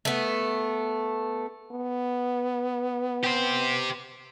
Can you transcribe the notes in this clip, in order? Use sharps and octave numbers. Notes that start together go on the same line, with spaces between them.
A3 B3
B3
G4 C5